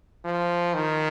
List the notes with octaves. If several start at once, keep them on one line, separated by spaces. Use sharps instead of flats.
F3
D#3